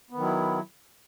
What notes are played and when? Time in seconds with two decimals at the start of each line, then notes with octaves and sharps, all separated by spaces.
0.10 B3
0.15 D#3
0.19 F#3
0.24 E4